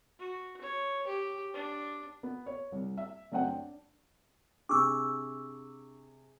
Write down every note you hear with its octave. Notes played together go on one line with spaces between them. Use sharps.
F#4
C#5
G4
D4
B3
C#5
C2
E5
F#2 A3 C4 C5 F#5 G5
D4
C3 D4 G#4 C#6 D6 E6